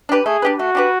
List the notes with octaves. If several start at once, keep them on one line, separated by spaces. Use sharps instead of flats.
D4 G4 B4
A3 G#4
D4 G4 B4
A3 F#4
D4 G4 B4